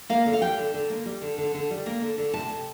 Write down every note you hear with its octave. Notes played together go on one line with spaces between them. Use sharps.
A#3 F5
D3
F5
G3 G5
D3
D3
A#3
G3
D3
D3
D3
G3
A#3
D3
D3
C3 A5
C3